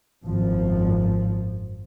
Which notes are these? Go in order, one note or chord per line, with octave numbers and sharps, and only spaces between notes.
G#1 F#2 F3